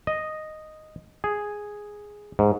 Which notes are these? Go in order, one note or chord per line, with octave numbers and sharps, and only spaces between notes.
D#5
G#4
G#2